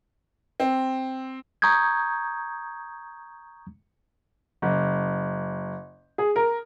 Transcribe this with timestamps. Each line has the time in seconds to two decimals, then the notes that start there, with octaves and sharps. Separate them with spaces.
0.60 C4
1.62 A#5 C#6 D#6 G6 G#6
4.62 F#1
6.18 G#4
6.36 A#4